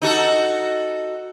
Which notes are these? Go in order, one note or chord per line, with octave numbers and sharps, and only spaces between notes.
D#4 F#4 A4